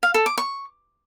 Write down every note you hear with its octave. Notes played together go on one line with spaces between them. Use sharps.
F5
A4
D6
C#6